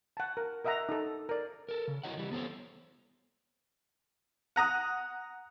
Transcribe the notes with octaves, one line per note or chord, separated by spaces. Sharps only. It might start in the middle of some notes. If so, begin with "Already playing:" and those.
F#5 A5
A#4
A#4 D#5 E5 F#5 A#5
D#4 A4
A#4 D5
A4 A#4
C#3
E4 F#4 C#5 D#5 F#5
E3 G3
B3 A4 C5 C#5
F#5 A#5 D#6 F#6